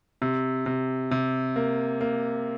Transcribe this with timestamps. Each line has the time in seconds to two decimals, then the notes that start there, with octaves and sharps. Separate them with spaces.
0.22 C3
0.66 C3
1.11 C3
1.56 A#3
2.01 A#3